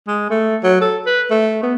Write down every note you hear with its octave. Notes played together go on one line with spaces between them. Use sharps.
G#3
A3
F#3
A4
B4
A3
B3